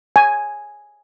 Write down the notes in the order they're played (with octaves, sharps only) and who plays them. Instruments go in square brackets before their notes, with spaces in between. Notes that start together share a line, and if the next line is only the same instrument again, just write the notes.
[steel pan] G#5